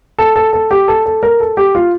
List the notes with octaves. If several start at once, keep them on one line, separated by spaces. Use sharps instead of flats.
A4
A4
A4
G4
A4
A4
A#4
A4
G4
F4